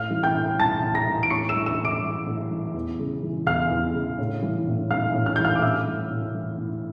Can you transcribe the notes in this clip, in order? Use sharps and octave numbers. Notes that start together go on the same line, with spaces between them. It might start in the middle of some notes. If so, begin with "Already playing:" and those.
Already playing: A2 F5 F6
E3
G5 G6
A2
E3 A5 A6
A2
A#5 A#6
E3
D7
A2 C#6 C#7
E6 E7
E3
E6 E7
A2
D6 D7
E3
A2
E3
E2
C#3
E3
E2 F5 F6
E2
C#3
A2
E3
A2
E3 F5 F6
A2
F6
E3 G6
F5 F6
D6
A2 E5 E6
E3
A2
E3
A2